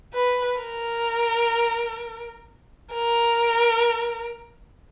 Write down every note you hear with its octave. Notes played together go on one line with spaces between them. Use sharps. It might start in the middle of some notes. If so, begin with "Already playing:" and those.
B4
A#4
A#4